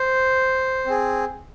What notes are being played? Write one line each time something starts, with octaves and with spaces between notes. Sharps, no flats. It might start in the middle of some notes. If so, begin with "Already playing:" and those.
Already playing: C5
C4 G#4